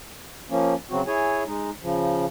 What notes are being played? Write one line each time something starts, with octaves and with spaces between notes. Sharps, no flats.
F3 A#3 C#4
C#3 F#3 C4 F#4
E4 G#4 C#5 G#5
G#3 D#4
C#3 F3